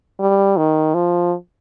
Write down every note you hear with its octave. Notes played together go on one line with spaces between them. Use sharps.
G3
D#3
F3